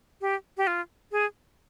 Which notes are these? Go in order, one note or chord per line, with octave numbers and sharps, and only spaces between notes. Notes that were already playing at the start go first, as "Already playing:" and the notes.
G4
G4
F4
G#4